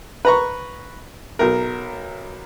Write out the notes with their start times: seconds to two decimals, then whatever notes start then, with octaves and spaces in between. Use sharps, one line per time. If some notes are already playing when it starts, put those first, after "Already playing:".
0.25 B4 A#5 C#6
1.39 B1 A#4